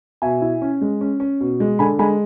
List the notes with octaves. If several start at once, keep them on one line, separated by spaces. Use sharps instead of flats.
B2 E5 G#5
E4
C#4
G#3
C#4
C#4
B2
G#3
D3 G#5 B5
G#3 G#5 B5